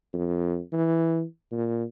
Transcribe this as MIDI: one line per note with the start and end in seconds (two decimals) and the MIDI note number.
0.13 0.60 41
0.73 1.23 52
1.52 1.84 46